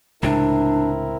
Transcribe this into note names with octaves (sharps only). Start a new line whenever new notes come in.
C#2 A2 C3 C4 D4 E4 A#4